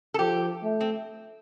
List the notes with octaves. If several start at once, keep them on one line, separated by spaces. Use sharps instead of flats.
A4
F3 G4
A3
C4